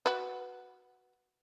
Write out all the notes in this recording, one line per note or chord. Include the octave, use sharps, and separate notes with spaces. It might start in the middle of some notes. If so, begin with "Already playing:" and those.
F#4 B4